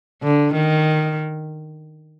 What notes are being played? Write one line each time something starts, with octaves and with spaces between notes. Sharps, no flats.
D3
D#3